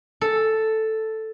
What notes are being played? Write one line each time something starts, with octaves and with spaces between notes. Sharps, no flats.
A4